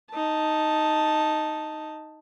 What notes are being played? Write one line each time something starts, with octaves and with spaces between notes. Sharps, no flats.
D#4 A5